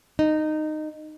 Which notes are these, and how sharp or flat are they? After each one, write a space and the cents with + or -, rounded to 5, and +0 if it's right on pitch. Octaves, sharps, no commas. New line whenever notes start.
D#4 -15